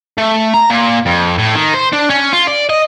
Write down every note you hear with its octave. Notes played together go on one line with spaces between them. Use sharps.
A3
A#5
A#2
F2
A2
D#3
C5
D4
C#4
F4
D5
D#5